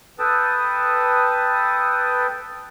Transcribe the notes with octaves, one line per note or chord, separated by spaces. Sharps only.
A4 B4 G5 A5 D#6